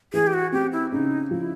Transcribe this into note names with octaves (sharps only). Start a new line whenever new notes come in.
E3 G#4
G4
F#4
C4 G4
E4
C#3 D#4
F3 E4